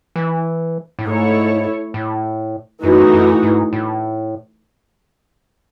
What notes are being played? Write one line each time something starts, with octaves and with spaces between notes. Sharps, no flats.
E3
A2
G#2 A3 E4 A4 C#5
A2
F#2 E3 A3 D#4 F#4
F#2
G#2
A2